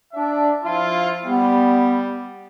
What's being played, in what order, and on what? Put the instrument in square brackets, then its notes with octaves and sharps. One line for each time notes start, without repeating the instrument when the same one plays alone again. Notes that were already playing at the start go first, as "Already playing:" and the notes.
[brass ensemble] D4 E5
F3 E4 F4
[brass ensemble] G3 [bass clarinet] B3